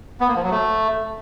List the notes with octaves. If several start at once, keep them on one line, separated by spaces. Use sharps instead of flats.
B3
A#3
F3
F#3
A3